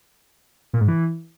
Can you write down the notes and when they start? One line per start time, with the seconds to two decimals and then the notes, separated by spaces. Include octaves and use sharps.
0.73 A#2
0.81 G#2
0.88 E3